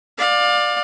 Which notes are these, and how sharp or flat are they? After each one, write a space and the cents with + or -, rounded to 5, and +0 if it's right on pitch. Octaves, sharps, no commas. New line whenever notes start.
D5 +15 F5 +25